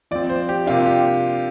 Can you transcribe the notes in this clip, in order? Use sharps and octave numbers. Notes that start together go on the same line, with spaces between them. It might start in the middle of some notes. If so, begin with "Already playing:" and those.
F3 C4 D5
C5
G4
C3 A#3 D4 F4
G4